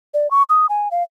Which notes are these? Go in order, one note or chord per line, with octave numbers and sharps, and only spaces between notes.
D5
C#6
D#6
G#5
F5